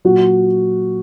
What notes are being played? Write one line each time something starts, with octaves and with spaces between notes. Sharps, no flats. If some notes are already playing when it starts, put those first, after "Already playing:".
A#2 F#3 F#4